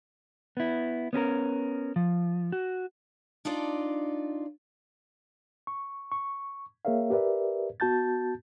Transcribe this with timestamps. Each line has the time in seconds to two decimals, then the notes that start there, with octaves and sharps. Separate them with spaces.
0.57 B3 E4
1.13 B3 C#4 G4 A#4
1.96 F3
2.52 F#4
3.45 D4 D#4 F4 D5
5.67 C#6
6.12 C#6
6.85 A#3 G#4 A#4 C#5 E5 F5
7.10 G4 A#4 B4 D5 E5
7.80 B3 F#4 A5 G6 A6